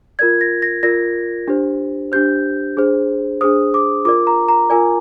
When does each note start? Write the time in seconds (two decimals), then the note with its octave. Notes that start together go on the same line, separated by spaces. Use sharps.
0.19 F4 A#4 D5 G#6
0.41 A#6
0.62 A#6
0.83 F4 A#4 D5 A#6
1.48 D4 G4 C5
2.12 D4 G4 C5 G6
2.77 D4 G#4 C5
3.41 D4 G#4 C5 D#6
3.74 D6
4.05 F4 A#4 D5 D6
4.27 A#5
4.48 A#5
4.70 F4 A#4 D5 G#5